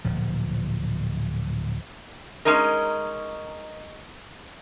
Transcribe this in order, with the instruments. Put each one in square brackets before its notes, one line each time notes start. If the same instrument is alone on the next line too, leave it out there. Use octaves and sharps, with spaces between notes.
[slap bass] D1 A#2 F3
[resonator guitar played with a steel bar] G#3 C#4 D#4 A#4